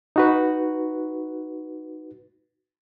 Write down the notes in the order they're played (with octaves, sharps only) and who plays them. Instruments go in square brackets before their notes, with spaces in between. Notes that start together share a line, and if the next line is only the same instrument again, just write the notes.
[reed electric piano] D#4 F#4 B4